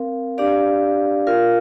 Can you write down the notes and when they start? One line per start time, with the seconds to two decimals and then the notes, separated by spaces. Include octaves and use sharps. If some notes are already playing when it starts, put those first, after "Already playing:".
Already playing: C4 A#4 F5
0.38 D4 G4 D5 F5
1.27 F4 A#4 F5